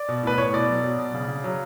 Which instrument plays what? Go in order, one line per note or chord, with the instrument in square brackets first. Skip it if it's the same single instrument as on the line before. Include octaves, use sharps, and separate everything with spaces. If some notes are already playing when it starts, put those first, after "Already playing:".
Already playing: [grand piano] D5
B2
A2 B4
A2 C#5
B2 D5
F#3
B2
B2
C#3
C#3
F#3